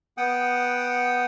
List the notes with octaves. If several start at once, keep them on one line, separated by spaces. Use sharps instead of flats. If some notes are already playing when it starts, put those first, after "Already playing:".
B3 F#5 G5 D#6